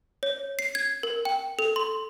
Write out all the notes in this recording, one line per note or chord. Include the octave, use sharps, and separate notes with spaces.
C#5
C7
G#6
A#4
G5
A4
C6